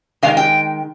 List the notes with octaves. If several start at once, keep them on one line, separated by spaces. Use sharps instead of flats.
D#3 G#3 F5
G5